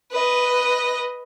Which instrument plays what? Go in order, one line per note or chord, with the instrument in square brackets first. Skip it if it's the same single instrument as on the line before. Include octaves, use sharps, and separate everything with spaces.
[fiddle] B4 D#5